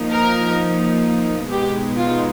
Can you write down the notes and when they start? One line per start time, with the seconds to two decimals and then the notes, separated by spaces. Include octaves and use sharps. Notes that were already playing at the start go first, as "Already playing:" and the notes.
Already playing: F3 A#3 D#4
0.11 A#4
1.50 B2 G#3 B3 D#4 G4
1.97 F4